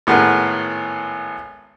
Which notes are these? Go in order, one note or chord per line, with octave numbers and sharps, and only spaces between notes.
G#1 A2 G#3 B3 A#4 F#5